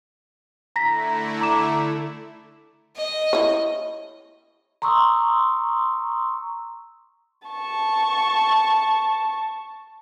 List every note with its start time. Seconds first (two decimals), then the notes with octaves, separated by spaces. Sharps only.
0.76 D3 A3 E4 A#5 A#6 B6
1.41 A#5 D6 E7
2.97 D#5
3.33 E4 C#5
4.82 A#5 C6 C#6 D#6 E6
7.48 A5 C#6